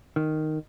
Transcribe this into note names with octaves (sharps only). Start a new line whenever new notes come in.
D#3